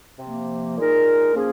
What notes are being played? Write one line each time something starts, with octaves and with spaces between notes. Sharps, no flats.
C3 F3 A#3
A#2 G#3 D#4 A#4
F3 A#3 C#4 G#4